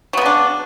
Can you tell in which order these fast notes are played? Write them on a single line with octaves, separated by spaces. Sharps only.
F#3 B3 C#3 D4